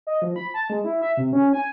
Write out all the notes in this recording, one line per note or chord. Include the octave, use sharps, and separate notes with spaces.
D#5
F3
B5
A5
G#3
E4
E5
C3
C#4
G#5